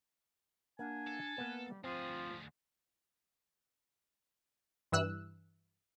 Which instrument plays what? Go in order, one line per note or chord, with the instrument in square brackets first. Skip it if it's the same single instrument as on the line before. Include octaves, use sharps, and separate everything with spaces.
[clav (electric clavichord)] A#3 F#5 [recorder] D4 [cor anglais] G#5
[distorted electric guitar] A4
[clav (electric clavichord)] A#3 B3 [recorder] B4
[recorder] G3
[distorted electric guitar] D2 G#4 [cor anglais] F3 [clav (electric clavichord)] C4 [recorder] F4
[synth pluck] G2 E3 E6 F#6